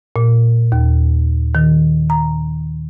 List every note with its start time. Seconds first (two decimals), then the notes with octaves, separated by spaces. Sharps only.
0.16 A#2
0.72 D#2
1.55 D#3
2.10 A#5